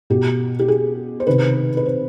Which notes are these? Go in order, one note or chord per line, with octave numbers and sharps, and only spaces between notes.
B2 G4
G4
G#4
C5
C3 D#3 B4
B4
C5